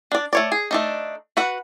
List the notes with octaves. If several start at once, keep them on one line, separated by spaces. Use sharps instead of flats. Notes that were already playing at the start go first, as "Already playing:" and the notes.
D4 D5
A3 C#5 D5
G#4
A3 D4 D#4
F#4 B4 F#5